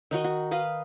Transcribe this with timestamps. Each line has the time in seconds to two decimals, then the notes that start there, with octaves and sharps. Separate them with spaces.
0.11 D#3 D#4 F#4 D#5
0.24 F#4
0.51 B4 D#5 F5